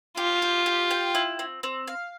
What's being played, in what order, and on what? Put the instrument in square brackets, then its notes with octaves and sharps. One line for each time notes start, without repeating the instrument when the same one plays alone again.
[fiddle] F4 [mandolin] G4
[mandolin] G4
G4
G5
E4
C4
C4
F5